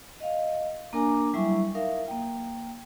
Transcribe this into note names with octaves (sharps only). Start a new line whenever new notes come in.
D#5 F5
A#3 D4 A#4 G#5 A#5 D6
F#3 G3 E4 E5 C#6
D#4 A#4 E5 F5
A#3 G5